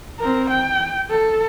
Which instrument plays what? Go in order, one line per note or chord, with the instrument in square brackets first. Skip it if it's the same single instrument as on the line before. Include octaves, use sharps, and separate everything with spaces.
[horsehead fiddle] C4 A#4
G5
A4